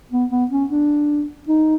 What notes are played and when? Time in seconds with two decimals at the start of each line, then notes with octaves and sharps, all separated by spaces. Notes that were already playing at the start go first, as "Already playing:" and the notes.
0.12 B3
0.31 B3
0.51 C#4
0.70 D4
1.49 D#4